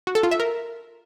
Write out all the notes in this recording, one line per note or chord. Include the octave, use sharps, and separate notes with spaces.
F#4
A4
F4
E5
A#4